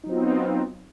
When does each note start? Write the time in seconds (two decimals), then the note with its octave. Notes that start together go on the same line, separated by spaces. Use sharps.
0.04 D#4
0.06 F#3
0.09 C4
0.12 F4
0.14 B3